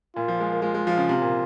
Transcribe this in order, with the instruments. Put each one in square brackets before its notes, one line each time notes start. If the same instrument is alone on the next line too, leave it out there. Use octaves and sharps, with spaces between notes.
[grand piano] A#2 [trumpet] F4
[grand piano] F3
G#3
A#3
[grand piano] G#3 [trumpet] F4
[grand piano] G#3
F3
C#3
C3
A#2